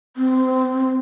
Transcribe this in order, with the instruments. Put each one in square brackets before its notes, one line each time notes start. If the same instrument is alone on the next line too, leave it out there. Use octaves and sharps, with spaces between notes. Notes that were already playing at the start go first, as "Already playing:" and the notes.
[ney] C4